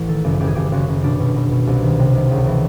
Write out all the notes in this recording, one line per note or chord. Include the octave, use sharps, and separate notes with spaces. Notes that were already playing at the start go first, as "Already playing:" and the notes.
Already playing: A1
D#3 A4
F#1
F#1 G4
G#4
F#1 G4
F#1 F#4
F#1
B2 D4
B2
B2
B2
C2
D#3
C3
D#3
C#2
E3